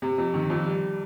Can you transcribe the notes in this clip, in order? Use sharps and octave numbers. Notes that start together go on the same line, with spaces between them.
C3
F2
D#3
F2
G3